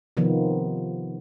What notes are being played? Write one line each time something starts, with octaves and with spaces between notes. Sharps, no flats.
C3 D#3 F3 B3